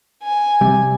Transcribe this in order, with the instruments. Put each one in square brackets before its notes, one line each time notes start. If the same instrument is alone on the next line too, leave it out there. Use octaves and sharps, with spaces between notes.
[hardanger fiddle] G#5
[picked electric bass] C3 G3